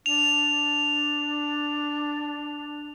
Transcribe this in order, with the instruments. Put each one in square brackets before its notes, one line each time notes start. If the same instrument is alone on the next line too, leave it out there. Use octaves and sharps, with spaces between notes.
[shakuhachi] D4 [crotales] F7